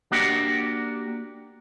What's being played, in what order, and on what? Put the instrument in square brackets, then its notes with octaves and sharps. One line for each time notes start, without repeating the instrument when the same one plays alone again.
[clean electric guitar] A#3 D4 F#4 G4